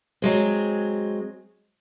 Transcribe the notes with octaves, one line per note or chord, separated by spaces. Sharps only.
F#3 G#3 C4